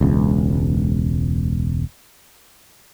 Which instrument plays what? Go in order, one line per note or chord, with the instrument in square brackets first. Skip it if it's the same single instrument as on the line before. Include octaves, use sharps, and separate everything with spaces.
[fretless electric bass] E1 C#2